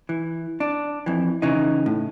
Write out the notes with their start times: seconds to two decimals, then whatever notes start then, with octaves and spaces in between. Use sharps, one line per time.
0.09 E3
0.60 D4
1.06 F2 E3
1.42 C#3 E3 D#4
1.86 A2